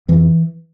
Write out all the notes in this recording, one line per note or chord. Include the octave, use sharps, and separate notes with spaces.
F2 E3